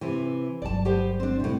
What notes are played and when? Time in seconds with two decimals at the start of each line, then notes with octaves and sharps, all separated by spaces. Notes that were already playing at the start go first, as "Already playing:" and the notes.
0.01 C3 E3
0.62 G1 F#3 D5 A5
0.85 B3 G4 C5
1.20 C4 D4
1.40 A2 C3 G3